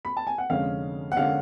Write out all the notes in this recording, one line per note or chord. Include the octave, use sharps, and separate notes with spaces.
B5
A5
G#5
F#5
F1 F2 D3 G#3 C#4 F5
F#5
D3 G#3 C#4 F5